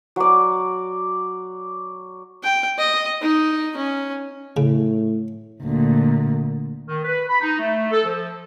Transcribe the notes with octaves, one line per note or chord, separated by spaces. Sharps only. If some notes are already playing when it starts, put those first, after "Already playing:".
F#3 D5
G5
D#5
D#4
C#4
A2 C#3
D2 A#2
D#3
B4
B5
D#4
A3
A4
F3